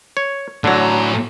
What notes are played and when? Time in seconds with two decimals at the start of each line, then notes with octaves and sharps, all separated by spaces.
0.17 C#5
0.64 A2 D3 F#3 A#5